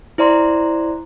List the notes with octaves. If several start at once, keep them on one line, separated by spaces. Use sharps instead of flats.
E4 C5 D5 A#5 C6